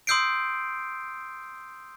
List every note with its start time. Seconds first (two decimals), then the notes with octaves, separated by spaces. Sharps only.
0.07 C6 D#6 E6 G6 C7 D7